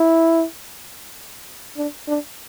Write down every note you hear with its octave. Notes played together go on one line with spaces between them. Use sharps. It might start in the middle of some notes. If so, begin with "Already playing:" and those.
Already playing: E4
D4
D4